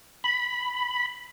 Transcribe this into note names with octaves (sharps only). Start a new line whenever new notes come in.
B5